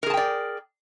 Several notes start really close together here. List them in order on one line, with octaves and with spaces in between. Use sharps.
A#4 G#4 A5 G5 D5